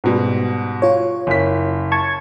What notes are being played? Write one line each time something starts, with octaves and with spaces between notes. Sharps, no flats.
G#2 B2 G3
F4 C#5
F#1 B6
A5 C#6 G#6